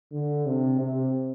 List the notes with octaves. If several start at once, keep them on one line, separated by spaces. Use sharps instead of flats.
D3
C3
C3